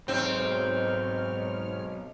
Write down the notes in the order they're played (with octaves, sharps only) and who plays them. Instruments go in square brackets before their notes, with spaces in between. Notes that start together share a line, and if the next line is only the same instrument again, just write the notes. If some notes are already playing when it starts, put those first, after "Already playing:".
[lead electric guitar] B1 [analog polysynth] G#2 C#5 F6 [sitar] C4